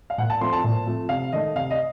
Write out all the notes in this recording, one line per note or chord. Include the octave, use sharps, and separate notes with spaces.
F5
A#2 F#5
A5
F3 A3 C4 F4 C6
A5
A#2
F3 A3 C4 F4
C3 F5
D#3 A3 D#5
C3 F5
D#5